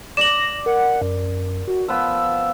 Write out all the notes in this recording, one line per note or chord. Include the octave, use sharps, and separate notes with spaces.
D5 A#6 E7 F#7
A#4 F#5
F#2
F#4
F3 B3 E6